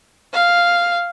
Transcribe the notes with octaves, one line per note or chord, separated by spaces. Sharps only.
F5